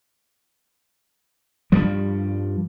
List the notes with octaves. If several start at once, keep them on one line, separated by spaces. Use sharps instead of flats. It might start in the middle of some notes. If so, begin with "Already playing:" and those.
G2 F3 G3